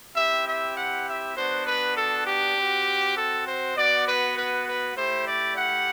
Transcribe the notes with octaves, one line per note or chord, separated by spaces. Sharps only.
C4 E4 G4 E5
E5
F#5
E5
B3 D4 F#4 C5
B4
A4
G4
C4 F#4
A4
C5
B3 F#4 D5
B4
B4
B4
A3 E4 G4 C5
D5
F#5